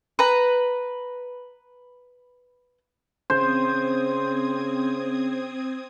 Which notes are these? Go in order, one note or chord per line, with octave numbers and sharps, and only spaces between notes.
B4 A#5
C#3 C4 C5 D#6 G#6